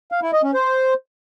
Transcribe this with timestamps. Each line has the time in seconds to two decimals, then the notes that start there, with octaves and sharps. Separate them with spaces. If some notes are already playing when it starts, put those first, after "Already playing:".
0.12 F5
0.22 E4
0.33 D#5
0.43 C#4
0.54 C5